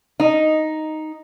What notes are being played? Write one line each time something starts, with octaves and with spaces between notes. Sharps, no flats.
D#4